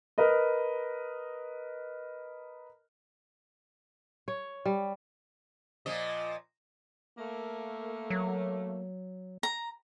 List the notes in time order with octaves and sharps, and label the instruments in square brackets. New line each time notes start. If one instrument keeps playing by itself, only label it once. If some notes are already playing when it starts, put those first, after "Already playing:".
[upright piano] A#4 B4 D#5
[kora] C#5
G3
[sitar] A#2 F3 D#5
[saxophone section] A3 A#3
[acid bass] F#3
[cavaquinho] A#5